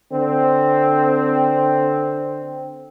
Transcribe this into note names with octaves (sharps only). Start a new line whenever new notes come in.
D3 C4